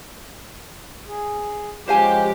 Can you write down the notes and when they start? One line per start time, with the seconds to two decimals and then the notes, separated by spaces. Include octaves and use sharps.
1.08 G#4
1.87 F3 G#3 C#4 G4 C5 F5 G#5